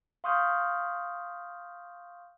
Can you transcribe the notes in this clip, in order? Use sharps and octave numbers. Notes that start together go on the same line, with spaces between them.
F5 C6 C#6 D#6 F6 G6